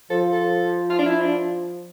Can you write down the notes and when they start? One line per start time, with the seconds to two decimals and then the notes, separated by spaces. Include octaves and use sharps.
0.10 F3 A4
0.33 A4
0.90 F4
0.99 D4
1.06 E4
1.22 D4